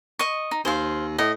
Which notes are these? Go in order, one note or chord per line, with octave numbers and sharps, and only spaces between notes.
D#5 C#6
D#4
D#2 C5 F5
A2 D#5